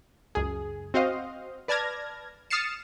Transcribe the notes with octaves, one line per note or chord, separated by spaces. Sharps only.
C#2 F#2 G#4
C4 F#4 C5 D#5 F5
B4 D5 A5 F6 G#6 A#6
D#6 F6 A6 C7 C#7 E7